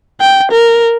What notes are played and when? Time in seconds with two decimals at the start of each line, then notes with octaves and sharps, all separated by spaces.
0.21 G5
0.51 A#4